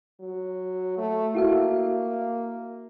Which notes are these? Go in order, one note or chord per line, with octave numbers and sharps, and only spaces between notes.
F#3
A3
A#3 E4 F#4 E5